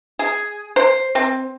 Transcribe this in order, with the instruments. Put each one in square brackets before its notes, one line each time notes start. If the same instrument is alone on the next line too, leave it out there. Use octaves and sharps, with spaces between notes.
[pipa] G#4
C5
C4